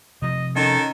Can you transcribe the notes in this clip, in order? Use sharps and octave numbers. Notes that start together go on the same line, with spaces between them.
C3 F3 D#5
D#3 C#4 A4 D#5